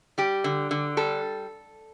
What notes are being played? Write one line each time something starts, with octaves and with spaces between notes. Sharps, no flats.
G3 G4
D3
D3
G3 A4